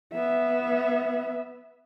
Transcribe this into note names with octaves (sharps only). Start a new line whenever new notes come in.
B3 E5